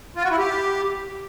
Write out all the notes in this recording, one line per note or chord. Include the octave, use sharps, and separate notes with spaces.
F4
F#4
E4
G4